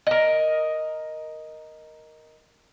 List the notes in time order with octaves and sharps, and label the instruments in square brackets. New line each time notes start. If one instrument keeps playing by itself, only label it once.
[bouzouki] A#4 D#5